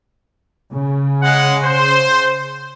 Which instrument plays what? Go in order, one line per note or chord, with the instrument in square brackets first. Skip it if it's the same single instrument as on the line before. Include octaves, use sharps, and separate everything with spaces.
[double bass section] C#3
[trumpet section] G#3 F#5
C5